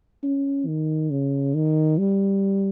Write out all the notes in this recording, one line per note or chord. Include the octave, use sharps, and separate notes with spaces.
C#4
D#3
C#3
D#3
G3